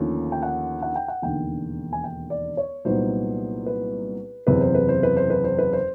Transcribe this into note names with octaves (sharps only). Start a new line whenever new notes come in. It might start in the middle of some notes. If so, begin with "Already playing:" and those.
Already playing: D#2 D3 F3 A3 C#4
G5
F#5
F#5
G5
F#5
E1 D#2 D3 G5
G#5
G5
D5
C#5
C2 A#2 F#3 B3 D#4 C5
B4
F#1 E2 C3 B4
C5
B4
C5
B4
C5
B4
C5
B4
C5